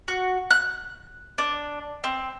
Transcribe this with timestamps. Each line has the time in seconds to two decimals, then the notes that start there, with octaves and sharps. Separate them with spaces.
0.08 F#4
0.51 F#6
1.38 D4
2.04 C4